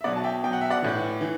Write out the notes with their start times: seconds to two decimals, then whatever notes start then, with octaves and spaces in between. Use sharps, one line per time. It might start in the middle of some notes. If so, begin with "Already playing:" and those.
0.01 E5
0.04 B2 F#3 D5 F#5
0.16 A5
0.24 E5 G5
0.44 B2 F#3 G5
0.53 F#5
0.61 E5
0.70 D5 F#5
0.82 A2 E3
1.21 E3